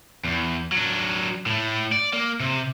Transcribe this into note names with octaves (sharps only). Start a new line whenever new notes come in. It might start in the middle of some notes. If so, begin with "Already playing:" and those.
E2
F#3 D4
A2 A3
D5
A#3
C3